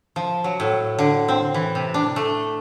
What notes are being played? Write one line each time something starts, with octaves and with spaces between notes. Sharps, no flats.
F3
F#3
A2
D3
C4
E3
C3
D4
A3